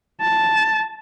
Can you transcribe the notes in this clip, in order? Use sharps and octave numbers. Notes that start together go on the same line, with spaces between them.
A5